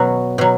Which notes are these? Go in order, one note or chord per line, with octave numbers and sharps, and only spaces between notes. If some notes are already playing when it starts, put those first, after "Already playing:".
Already playing: B2 F#3 F#4
B2 F#3